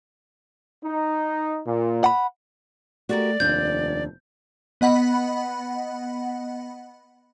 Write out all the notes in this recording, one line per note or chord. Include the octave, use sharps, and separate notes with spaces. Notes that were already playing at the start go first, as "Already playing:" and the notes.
D#4
A#2
F#5 B5
A3 F#4 G4 A#4 D5
F1 D#2 D4 G6
B3 D#5 F#5 B5